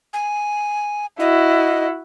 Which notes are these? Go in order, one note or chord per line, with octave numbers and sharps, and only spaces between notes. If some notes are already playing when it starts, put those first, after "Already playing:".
G#5
E4 F#4 D#5